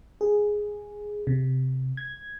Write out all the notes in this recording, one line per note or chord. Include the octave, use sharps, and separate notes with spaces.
G#4
C3
G#6